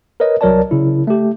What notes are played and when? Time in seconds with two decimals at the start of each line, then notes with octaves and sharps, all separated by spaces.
0.20 A#4 B4 C#5 D#5
0.41 C2 F#3 A#4 C#5 D5 A5
0.71 C#3 E4
1.07 A3 G4